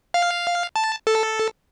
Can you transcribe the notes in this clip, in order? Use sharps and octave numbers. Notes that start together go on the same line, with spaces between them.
F5
A5
A4